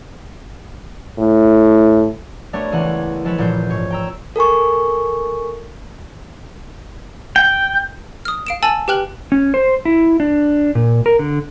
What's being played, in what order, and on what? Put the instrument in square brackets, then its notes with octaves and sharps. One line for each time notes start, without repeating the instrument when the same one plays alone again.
[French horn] A2
[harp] G3 A3 B3 D4 A#4 C#5
C#2 E3 F#5
F3 G#3 A4 B4 C#5
G1 A#2 F3 B3 G6 C7
G#2 C#5
G5 A#5 E6
[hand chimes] A4 A#4 G#5 C#6
[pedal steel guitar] G5
[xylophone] D#6 F6
F5 D7 E7
G#5 A5 E6 A6 F#7
G4 B4 G5 F6 F#6 F#7
[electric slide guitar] C#4
C5
E4
D4
A#2
A#4
D3